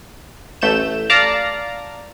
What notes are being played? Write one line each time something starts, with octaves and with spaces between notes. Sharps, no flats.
A1 A3 G6 E7
D5 F5 A5 A#5